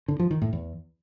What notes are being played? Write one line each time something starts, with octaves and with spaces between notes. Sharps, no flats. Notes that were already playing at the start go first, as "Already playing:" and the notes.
D3
F3
D#3
A2
E2